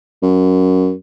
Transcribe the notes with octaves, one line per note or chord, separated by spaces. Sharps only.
F#2